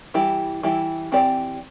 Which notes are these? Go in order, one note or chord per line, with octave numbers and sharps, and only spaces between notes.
E3 G3 E4 G4
E3 G3 E4 G4
E3 C4 G4 D5